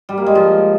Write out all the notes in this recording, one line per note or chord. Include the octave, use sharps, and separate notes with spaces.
G3
A#3
G#3
F3